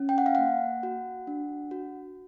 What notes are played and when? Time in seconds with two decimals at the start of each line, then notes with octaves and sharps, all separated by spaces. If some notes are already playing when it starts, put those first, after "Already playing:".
Already playing: C#4
0.09 G5
0.18 F#5
0.26 F5
0.35 A#3 F#5
0.83 F#4
1.27 D4
1.71 F#4